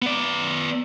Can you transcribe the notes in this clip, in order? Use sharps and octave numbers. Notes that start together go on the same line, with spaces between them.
B3 D5